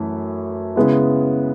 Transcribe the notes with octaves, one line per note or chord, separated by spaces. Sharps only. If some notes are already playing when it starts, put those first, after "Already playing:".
Already playing: F#2 E3 A3
C#3 G#3 B3 E4